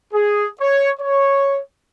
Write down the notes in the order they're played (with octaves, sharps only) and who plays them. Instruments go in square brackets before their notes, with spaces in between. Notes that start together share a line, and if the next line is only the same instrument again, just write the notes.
[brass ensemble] G#4
C#5
C#5